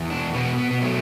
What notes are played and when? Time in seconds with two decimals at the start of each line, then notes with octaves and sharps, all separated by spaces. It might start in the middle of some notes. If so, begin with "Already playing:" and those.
Already playing: E2
0.10 D4
0.33 B2 B3
0.58 B3
0.71 B3
0.81 F#3 A3